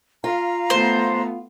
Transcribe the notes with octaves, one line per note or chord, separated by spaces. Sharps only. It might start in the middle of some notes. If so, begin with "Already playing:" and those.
F4 F5 A#5
A3 B3 C5